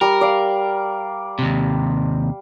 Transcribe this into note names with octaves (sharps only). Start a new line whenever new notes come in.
G3 A#4
D5 F5
D#2 C3